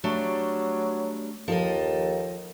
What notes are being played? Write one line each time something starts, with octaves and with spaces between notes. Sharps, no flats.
F#3 G3 A3 D4
D#2 F3 A4 D#5